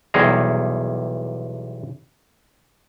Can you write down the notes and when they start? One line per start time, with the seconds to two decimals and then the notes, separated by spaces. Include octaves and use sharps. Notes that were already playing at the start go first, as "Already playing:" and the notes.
0.14 B1 E2 C3 G3 G#4 A#5